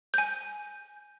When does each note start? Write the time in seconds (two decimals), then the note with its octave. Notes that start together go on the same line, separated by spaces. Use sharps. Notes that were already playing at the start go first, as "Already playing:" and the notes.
0.14 G#5 G6